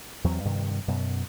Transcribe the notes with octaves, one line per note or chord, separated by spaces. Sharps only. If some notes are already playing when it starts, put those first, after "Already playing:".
E2 F#3 C4
G2 C3 D#3
F#2 B2